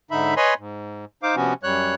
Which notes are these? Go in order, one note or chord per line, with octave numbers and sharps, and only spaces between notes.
G#2 D3 D#4 E5 B5
B4 C#5 D#5 G#5 B5 C6
G#2
D#4 C5 F5 D6
C3 F3 B3 C#4 F#4
F#2 G3 C#5 F#6